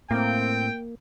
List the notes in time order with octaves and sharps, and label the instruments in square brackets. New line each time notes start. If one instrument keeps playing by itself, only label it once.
[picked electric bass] A2 [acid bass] A#3 [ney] C4 [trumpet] G5